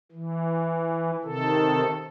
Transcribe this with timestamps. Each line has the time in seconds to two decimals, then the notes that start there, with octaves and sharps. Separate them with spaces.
0.12 E3
1.24 C3 D#3 A4